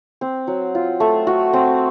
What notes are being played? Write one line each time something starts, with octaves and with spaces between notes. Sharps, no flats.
C4
F#3
F4
A3
F#4
C4